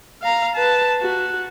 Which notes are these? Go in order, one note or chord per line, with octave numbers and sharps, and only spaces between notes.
F5 A#5
B4 A5
F#4